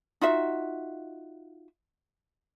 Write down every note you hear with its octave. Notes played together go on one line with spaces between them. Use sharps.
D#4 F4 F#4 E5